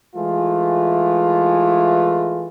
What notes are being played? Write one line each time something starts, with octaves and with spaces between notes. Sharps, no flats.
E3 G#3 A3 F4